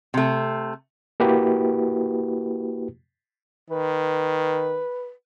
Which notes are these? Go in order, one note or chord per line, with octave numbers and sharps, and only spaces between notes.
C3 A3
A#3 E4 F#4 G4 B4
D#3 B4